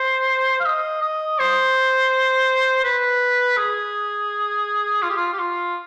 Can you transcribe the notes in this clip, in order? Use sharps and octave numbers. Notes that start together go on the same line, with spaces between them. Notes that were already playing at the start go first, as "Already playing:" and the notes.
Already playing: C5
F5
D#5
D#5
C5
B4
G#4
F4
G4
F4
G4
F4